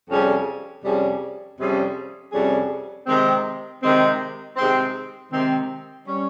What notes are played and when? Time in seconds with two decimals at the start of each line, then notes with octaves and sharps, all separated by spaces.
0.09 F2 C3 G3 C#4 G#4
0.84 F2 C3 G3 C#4 G#4
1.59 F2 C3 G3 C#4 G#4
2.32 F2 C3 G3 C#4 G#4
3.07 C3 D#3 G#3 C4
3.82 C3 D#3 G#3 C4
4.56 C3 D#3 G#3 C4
5.31 C3 D#3 G#3 C4
6.06 G3 C#4